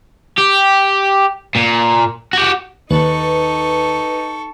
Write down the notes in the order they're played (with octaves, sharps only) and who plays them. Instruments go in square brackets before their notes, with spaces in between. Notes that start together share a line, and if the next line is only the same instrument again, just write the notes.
[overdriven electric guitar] G4
A#2
F#4 G4
[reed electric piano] D#2 [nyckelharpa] D#4 [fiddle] A4 C#6 [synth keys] B4